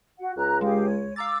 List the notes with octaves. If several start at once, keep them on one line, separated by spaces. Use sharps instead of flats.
F#4 F#5
C#2 A#5 F#6
G#3 G4 G#4 F5
C#5
F5 A#5 D6 E6 A6